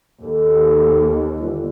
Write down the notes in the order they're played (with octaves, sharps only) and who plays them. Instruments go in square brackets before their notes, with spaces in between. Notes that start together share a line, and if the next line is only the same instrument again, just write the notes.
[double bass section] D#2 [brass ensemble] A4
[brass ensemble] G1